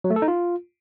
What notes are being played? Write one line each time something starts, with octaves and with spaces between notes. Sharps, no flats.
F#3
A3
A4
D#4
F4